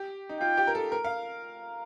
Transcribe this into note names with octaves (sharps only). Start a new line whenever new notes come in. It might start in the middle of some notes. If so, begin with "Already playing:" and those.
Already playing: G4
D#4
F4 G5
G4
A#4
A4
A#4
F5